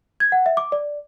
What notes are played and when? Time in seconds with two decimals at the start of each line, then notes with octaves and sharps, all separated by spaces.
0.20 G#6
0.32 F#5
0.46 E5
0.57 D6
0.72 D5